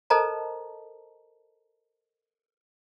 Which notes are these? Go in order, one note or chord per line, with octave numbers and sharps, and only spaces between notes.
A4 A#4 C5 D#5 A5 A#5